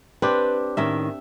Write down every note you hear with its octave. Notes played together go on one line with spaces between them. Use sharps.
C4 D4 G4 B4
A2 D#3 C#4 E5